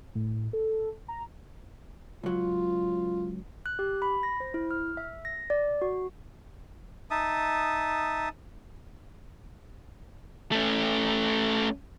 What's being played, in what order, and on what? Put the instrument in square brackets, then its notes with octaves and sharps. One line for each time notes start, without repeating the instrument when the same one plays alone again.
[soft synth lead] A2
A4
A#5
[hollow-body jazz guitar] C#2 F#3 [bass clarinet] F4
[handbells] F#6
G4
B5
A#6
C5
E4
F6
E5
A#6
D5
F#4
[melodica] D#4 E5 A5 D#6
[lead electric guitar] A3 C#4